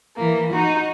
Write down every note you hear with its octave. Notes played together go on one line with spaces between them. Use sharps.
E3 A#3
D#4 F#4